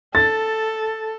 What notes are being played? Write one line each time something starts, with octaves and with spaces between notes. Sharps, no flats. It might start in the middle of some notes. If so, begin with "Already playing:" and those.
A4 A6